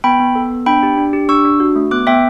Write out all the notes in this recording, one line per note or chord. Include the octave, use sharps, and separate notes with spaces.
B3 G5 B5
B3
A4
B3
D4 G5 B5
G4
D4
G4
D4 C#6 E6
D4
F#4
A3
B3 D6 F#6
B3 E5 G5